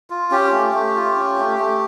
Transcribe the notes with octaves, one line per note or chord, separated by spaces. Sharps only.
F4
C#4 G4
A3
A3
F4
C#4
A3
A3